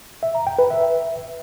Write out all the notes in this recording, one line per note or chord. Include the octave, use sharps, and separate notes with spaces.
E5
A#5
G5
B4
E5